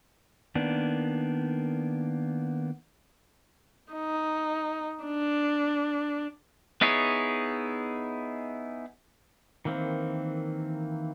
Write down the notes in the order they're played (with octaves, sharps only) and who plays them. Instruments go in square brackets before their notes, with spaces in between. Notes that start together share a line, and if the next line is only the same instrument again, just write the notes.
[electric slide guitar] D#3 A#3 B3 D4
[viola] D#4
D4
[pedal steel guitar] B3 D#4 E4 G#4 C#5
D#3 E3 A#3 C4